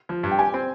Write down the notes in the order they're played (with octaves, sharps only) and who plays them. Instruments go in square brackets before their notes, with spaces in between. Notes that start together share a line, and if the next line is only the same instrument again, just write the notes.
[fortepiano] F3
G2
[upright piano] G5
[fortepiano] G4 [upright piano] G#5
[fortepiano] C4